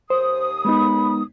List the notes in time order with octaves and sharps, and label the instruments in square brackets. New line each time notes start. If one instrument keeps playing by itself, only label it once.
[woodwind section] D#2 D#6 [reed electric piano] C5
[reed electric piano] G#3 B3 D#4 [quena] B5